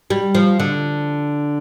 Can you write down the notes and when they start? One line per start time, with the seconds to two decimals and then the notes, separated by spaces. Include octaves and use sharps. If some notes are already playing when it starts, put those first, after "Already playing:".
0.10 G3
0.35 F3
0.59 D3